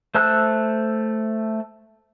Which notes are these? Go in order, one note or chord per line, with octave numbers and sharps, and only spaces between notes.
A3 C5 A5 E6 F#6